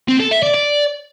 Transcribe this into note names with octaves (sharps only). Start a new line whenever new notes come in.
C4
A4
E5
D5
D5